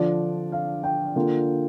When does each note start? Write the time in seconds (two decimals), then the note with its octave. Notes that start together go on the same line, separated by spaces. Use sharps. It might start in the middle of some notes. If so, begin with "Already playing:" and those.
Already playing: D3 F3 D4 D5
0.52 F5
0.83 G5
1.16 D3 A#3 F4